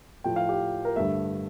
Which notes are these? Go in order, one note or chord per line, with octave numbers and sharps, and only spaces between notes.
A2 F3 A3 G5
F5
G4
A#4
G2 D3 A3 E5